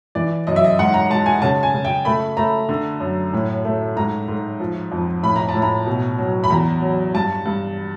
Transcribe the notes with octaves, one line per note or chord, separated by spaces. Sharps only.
E3 D5
F#2 D#5
E5
D#5
G#2 F#5
A#5
G#3 A5
G#5
C#3 A5
G#5
C#3
G5
A3 B5
A3 A#5
D3
F#2
A2
A3
G#2 A#5
G#2
F3
F2
A2 B5
A#5
A5
A2
A#5
B2
F#3
B5
E2 A#5
F#3
G2 A5
G2